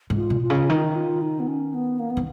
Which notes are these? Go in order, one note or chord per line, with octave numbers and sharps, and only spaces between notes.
G#2
F4
B2
F4
C#3
D#3 D#4
F4
D#4
F4
D#4
B3
C#4
B3
A#3
B3
D#3